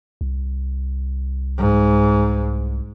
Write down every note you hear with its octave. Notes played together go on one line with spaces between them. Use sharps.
C2
G#2